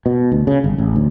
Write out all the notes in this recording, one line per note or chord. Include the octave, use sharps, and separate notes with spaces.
B2
D2
C#3
G1
A1
D2